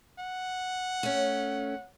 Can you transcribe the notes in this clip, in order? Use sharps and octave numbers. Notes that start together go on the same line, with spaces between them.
F#5
A3 C#4